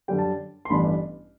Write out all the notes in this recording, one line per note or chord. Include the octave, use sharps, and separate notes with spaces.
F#2 D3 G3 G5
A5
C6
A1 G2 E3 B3 D4 B5